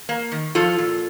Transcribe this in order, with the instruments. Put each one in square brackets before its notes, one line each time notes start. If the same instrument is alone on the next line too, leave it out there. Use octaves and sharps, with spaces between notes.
[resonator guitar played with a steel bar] A#3
D#3
F3 F4 A4
A#2